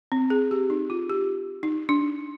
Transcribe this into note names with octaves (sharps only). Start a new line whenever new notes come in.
C4
G#4
G4
D#4
F4
G4
D#4
D4